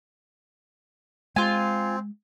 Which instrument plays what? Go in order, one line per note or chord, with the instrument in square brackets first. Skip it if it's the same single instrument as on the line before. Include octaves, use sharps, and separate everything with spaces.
[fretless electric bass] G#3 [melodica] C4 [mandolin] F4 G#5